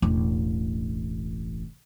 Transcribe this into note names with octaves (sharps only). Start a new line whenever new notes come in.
E1 A1